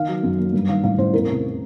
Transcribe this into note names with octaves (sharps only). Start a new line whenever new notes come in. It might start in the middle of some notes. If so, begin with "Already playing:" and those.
Already playing: D#3 F5
F#3
F#2
A#3
G2
D#3 F5
A1 F5
A1 C5
E2 A#4
C3